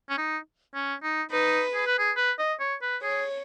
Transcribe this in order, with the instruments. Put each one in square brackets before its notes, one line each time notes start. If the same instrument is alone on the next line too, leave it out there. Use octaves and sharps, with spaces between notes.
[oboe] C#4
D#4
C#4
D#4
[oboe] D#4 [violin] B4
[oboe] G#4
B4
G#4
B4
D#5
C#5
B4
[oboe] G#4 [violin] C#5